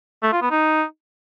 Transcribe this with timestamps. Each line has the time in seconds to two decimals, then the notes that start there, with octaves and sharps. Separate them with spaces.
0.23 A3
0.32 F4
0.42 B3
0.51 D#4